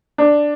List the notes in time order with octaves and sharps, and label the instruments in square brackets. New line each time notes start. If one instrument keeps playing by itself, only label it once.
[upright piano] D4